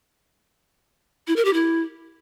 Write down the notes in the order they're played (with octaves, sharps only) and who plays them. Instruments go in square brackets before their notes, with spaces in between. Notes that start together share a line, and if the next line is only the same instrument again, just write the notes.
[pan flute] E4
A#4
G4
E4